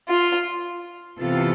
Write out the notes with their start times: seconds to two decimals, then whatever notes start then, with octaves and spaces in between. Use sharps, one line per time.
0.08 F4
1.19 C3 E3 B3 F4 A4